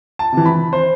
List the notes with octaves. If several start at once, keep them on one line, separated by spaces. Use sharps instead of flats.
A5
C3 E3
B5
C5